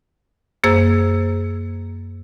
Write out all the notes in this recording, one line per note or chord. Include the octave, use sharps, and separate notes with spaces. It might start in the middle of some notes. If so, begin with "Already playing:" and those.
F#2 A#3 G#4 C5 E6 G#6